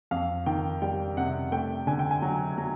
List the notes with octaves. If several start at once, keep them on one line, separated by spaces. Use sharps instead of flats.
F2 F5
D#3 G5
G3 G5
C3 F#5
A3 G5
D3 G#5
G5
G#5
F#3
F#3